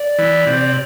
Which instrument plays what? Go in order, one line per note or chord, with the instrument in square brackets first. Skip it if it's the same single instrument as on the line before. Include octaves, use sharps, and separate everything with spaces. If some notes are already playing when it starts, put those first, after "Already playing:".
Already playing: [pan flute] D5
[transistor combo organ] E3
C3